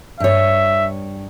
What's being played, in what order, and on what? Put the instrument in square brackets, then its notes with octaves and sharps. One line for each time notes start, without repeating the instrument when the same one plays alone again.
[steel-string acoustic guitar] G2 C#5 [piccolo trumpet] E5